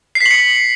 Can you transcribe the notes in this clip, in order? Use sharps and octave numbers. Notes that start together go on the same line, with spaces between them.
C7
B6
F#7
C#7